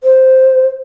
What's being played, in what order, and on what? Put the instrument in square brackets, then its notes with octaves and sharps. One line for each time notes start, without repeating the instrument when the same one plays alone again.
[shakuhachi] C5